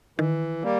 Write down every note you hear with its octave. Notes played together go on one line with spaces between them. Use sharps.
D#3 E3
G3 A#3